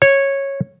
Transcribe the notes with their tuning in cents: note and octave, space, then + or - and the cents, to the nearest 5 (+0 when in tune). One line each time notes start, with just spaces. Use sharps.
C#5 -10